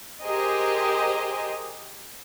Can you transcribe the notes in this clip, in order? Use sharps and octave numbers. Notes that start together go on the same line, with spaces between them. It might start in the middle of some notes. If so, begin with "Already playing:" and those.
G4 G#4 A#4 C5 D#5